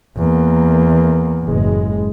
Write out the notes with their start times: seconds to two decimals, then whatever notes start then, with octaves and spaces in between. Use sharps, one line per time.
0.17 E2 A#3
1.44 F#1 A2 G#3